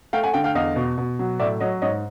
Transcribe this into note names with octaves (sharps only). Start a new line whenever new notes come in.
A3 F5 G5
F#5 G#5
D3 F5 G5
F5 G5
E2 D#5 F5
B2
B2
F#3
A2 D5 E5
F#3 C#5 D#5
G#2 C#5 D#5